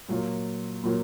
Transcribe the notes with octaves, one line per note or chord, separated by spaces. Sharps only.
A#2 F#3 A#3 F4
A#2 F#3 A#3 F4